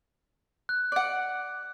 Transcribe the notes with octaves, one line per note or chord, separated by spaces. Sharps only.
F#6
D5 F#5